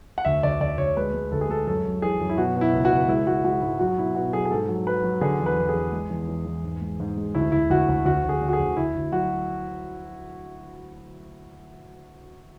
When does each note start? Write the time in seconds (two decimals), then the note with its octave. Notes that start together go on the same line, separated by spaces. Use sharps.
0.18 F#5
0.25 D2 E5
0.43 D2 D5
0.60 D2 D5
0.78 D2 C#5
0.97 G#3 B4
1.14 G#3
1.32 D2 A4
1.41 G#4
1.49 G#3 A4
1.67 F#2 A4
1.85 F#2
2.02 E3 G#4
2.20 F#2
2.29 E4
2.38 B2 F#4
2.56 B2 E4
2.73 C#2
2.85 F#4
2.91 C#2
3.08 G#3 E4
3.27 G#3 F#4
3.44 G#3 F#4
3.62 G#2 E4
3.79 F#3 F#4
3.98 B2 E4
4.15 B2 F#4
4.33 F#3 G#4
4.45 G#4
4.51 G#2 A4
4.68 F#3
4.86 F#3 B4
5.04 F#3
5.21 D3 G#4
5.40 E2
5.46 B4
5.58 E2
5.69 G#4
5.75 E2
5.92 G#3
6.10 E2
6.28 E2
6.46 E2
6.64 G#2
6.81 G#3
7.00 G#2
7.17 G#3
7.35 D2 E4
7.52 D2 E4
7.70 D2 F#4
7.89 D2
8.05 D2 F#4
8.24 D2 G#4
8.42 D3
8.49 F#4
8.53 G#4
8.59 D2
8.77 D2 E4
8.94 D2
9.12 F#3 F#4